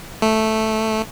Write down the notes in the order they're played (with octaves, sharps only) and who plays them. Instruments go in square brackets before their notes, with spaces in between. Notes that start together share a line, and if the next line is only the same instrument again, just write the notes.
[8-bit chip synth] A3